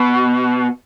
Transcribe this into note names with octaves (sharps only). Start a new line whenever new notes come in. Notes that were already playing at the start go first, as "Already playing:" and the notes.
Already playing: B2